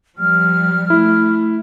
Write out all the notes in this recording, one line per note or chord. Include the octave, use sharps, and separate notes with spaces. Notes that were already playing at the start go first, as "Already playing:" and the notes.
F3 G3 F6
A3 E4